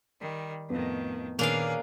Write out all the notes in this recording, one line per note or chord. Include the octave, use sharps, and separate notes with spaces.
D#3 G3
F2 A2 D#3 B3
A#2 D#3 A#3 C#4 D4 G#4 B4 F5